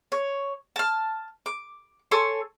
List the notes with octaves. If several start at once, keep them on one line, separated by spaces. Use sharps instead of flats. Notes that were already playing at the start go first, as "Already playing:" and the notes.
C#5
A5 F6
D6
A4 C#5 G#5 C6